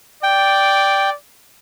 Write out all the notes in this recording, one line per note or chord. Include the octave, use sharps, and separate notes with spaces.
D5 G5